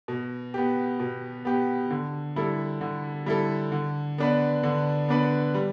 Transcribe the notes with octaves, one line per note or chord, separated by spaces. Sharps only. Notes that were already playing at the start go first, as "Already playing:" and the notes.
B2
B3 G4
B2
B3 G4
D3
G3 E4 A4
D3
G3 E4 A4
D3
B3 D4 B4
D3
B3 D4 B4
G3